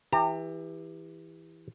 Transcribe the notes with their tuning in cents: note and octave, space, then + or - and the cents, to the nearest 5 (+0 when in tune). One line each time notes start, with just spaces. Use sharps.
E3 -5 G4 +25 A#5 -35